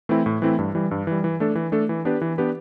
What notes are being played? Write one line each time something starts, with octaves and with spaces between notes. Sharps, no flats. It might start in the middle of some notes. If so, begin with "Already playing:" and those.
E3 A3 C4 E4
A2
E3 A3 C4 E4
G2
E3 G3
G2
E3 G3
E3
A3 D4 A4
E3
A3 D4 A4
E3
B3 D4 G4 B4
E3
B3 D4 G4 B4